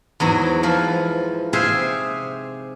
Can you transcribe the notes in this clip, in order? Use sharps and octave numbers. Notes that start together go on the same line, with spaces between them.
E2 G#2 F#3 D5
E3 F3 F4
C3 G#4 C5 E5 F5